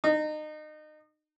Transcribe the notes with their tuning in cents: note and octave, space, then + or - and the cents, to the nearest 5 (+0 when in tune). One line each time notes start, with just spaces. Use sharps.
D#4 -30